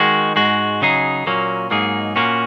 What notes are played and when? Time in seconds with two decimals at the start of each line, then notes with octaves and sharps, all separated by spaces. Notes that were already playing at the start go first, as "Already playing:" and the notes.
Already playing: D#3 G#3 F#4
0.36 G#2 G#3 F#4
0.81 C#3 F#3 D#4 G#4
1.26 A#2 F#3 A#3 C#4
1.71 G#2 F#3 A#3 D#4 G#4
2.16 A#2 A#3 C#4 F#4